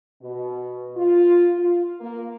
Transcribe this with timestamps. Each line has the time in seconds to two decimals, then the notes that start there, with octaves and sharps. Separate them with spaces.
0.22 B2
0.96 F4
1.58 F4
2.00 A#3